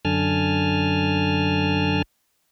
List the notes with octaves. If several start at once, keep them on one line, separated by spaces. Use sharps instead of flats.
F#2 D3 G#5 A5 F6